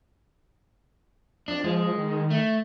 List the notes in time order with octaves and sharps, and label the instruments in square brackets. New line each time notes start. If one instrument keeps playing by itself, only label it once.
[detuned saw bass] F2 [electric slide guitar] D4
[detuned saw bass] F3 [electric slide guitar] G#3
[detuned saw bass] D#3
[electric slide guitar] A3